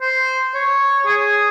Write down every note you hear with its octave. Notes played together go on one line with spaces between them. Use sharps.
C5
C#5
G#4